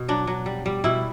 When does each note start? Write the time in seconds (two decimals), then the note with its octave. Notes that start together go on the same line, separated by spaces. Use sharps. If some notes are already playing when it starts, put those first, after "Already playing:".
Already playing: B2
0.08 F#3 D4
0.27 F#3
0.46 G3
0.66 G3
0.84 B2 E4